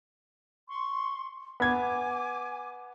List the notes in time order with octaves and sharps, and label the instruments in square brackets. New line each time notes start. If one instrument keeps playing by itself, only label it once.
[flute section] C6 C#6
[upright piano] B3 G#6 [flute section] G#5 D6